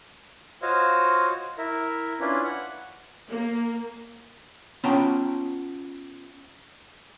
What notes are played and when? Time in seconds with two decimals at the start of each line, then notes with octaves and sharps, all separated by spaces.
0.62 F4 F#4 C5 C#5 D#5 F5
1.58 E4 A#4 E5
2.20 C#4 D4 E4 F4 B4
2.44 F#5
3.29 A#3
4.84 B3 C#4 F4 G5 A5 A#5